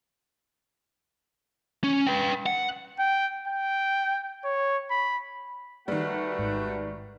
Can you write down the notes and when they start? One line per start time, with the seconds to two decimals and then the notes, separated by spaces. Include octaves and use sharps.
1.84 C#4
2.07 B4 G5
2.46 F#5
2.99 G5
3.48 G5
4.44 C#5
4.91 B5
5.88 D#3 G3 A3 F#4 B4 F#5
6.39 G#1 G#2